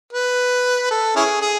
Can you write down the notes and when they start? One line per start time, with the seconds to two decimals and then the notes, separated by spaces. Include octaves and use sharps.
0.13 B4
0.90 A4
1.16 C#4 E4 G#4
1.41 G#4